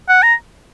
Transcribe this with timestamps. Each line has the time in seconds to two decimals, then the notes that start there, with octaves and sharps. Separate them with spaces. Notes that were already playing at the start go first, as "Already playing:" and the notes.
0.09 F#5
0.23 A#5